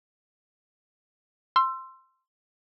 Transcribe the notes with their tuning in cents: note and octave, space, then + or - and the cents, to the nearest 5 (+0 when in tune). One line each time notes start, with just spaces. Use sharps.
C6 +0 E6 +25